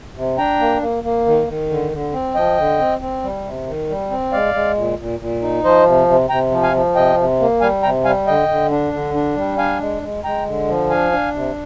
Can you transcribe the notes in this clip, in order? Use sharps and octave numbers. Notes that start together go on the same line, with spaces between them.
C3
D4 G5 A#5
A#3
A#3
A#3
D#3
D#3
D3
D3
C4
F3 D#5 G5
D3
C4
C4
G3
C3
D#3
G3
C4
G#3 D5 F5
G#3
A#2
A#2
A#2
D#4
F3 C5 D#5
C3
C3
C3 G5 A#5
F3
F5 G#5
F3
C3 D#5 G5
C3
A#3
G3 F5 G#5
C3 G5 A#5
G3 F5 G#5
D3 D#5 G5
D3
D4
D3
D4
G3
D4 F5 G#5
G#3
G#3
G#3 G5 A#5
D3
F3
D4 F5 G#5
D4
C3